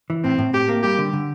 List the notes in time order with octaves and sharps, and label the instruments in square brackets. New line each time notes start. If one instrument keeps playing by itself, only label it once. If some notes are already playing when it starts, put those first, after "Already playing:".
[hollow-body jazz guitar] E3
[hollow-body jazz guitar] A2 [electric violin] C4
[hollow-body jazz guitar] A2
[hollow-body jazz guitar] A2 [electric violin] G4
[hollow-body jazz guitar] A#3
[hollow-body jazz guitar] G3 [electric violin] G4
[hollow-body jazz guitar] D3
D3